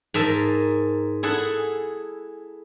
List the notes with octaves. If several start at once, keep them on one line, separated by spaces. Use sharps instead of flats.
G#2 A#4 E5 A5
E4 G#4 A4 F#5